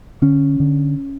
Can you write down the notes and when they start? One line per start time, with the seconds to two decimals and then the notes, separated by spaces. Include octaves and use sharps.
0.22 D3 C#4
0.60 D3